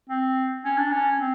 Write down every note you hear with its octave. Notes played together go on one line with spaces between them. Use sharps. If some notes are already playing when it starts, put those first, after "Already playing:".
C4
C#4
D4
C#4
C4